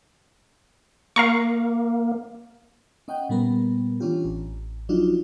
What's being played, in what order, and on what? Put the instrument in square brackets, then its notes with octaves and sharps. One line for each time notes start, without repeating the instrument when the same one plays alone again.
[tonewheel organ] A#3 [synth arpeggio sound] F5 A#5 C#6
[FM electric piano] C#4 D#5 F#5 G5
A#2 G3 B3 A#4
E3 C#4 D4 F4 G4
A1
F3 F#3 D4 D#4 F4 F#4